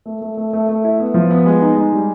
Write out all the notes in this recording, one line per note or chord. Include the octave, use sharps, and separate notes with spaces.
A3
A3
A3
A3
A3
E4
B3
F3
B3
G#3
D#4
G#3
G3